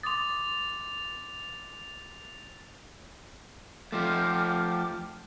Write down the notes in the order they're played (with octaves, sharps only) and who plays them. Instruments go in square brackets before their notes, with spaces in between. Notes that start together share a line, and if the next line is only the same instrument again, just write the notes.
[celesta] C6 D6 D#6 [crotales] A6 F7
[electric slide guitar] F3 A3 [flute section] G5 D6 F6